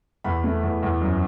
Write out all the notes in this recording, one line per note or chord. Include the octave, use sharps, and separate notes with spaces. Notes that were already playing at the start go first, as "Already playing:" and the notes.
E2 B5
A3
E2
E2
F#2